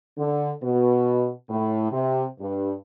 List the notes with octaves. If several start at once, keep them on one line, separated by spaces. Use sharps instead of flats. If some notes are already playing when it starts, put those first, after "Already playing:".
D3
B2
A2
C3
G2